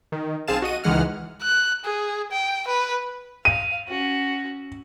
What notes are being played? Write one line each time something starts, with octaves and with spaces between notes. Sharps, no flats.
D#3
B1 C4 G#4 F5 A5 E7
F#4 D#5 D#7
C#2 D#3 E3 G#3 F#5 F6
F#6
G#4
G5
B4
F5 D#7
C#4 F#4